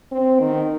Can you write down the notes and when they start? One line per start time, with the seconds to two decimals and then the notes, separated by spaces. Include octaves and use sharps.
0.12 C4
0.40 D#3